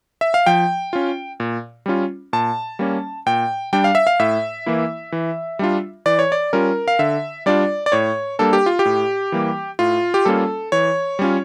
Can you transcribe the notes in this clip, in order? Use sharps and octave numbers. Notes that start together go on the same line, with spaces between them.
E5
F5
F3 G5
C#4 F4
A#2
G3 C#4 F4
A#2 A5
G3 A#3 C#4
A#2 G5
G3 D4 G5
F5
E5
F5
A2 E5
E3 A#3 E4
E3
G3 D4 F4
E3 D5
C#5
D5
G3 C#4 F4 A#4
F5
D3 E5
G3 D4 F4 D5
D5
A2 C#5
G3 A#3 D4 A4
G4
F4
G4
A2
E3 G3 A#3
A2 F4
G4
G3 A#3 C#4 F4 A4
E3 C#5
G3 C#4 F4